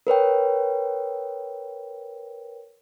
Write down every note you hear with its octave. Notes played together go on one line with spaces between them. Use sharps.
A#4 B4 C#5 G5